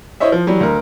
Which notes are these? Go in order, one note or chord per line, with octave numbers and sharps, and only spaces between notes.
E4 C5 C#5 D#5 E5
F3
E3 F#3 G3
D2 A#4